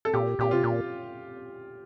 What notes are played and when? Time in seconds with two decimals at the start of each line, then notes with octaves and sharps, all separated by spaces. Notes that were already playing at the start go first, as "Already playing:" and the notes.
0.05 A4
0.13 A#2 G4
0.39 A#2 G4
0.51 C3 F4
0.64 A#2